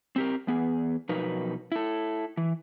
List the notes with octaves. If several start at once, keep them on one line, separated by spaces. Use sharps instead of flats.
C4 G4 A#4
E2 B3 G#4
B2 F3 F#3 D#4 A#4 B4
E4 A4
E3